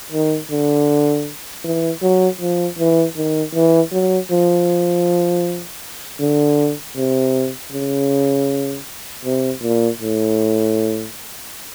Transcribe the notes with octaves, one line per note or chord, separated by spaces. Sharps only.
D#3
D3
E3
F#3
F3
E3
D#3
E3
F#3
F3
D3
C3
C#3
C3
A#2
A2